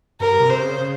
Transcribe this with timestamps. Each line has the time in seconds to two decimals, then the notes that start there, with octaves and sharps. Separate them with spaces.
0.20 G2 A#4
0.40 C3
0.50 C5
0.60 C#3
0.79 C#3